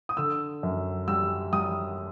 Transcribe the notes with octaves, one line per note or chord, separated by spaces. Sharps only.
D#6
D3 E6
F#2
G3 E6
G3 D#6